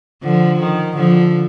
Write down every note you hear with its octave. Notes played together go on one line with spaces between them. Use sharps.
D3 F3
D#3
D3 F3